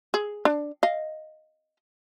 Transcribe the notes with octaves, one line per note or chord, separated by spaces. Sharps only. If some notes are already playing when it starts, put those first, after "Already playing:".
G#4
D4
D#5 F5